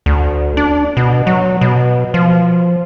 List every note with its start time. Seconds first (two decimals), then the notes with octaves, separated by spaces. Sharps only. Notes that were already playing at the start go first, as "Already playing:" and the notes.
0.06 D2
0.57 D4
0.97 B2
1.27 F#3
1.61 B2
2.14 F3